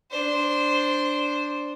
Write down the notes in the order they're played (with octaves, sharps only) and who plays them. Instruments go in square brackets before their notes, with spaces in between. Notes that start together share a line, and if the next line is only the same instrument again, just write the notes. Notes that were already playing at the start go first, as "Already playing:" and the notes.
[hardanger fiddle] D4 C5